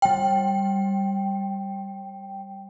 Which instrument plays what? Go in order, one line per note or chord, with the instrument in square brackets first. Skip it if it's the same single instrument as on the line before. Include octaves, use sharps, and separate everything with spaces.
[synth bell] G3 G5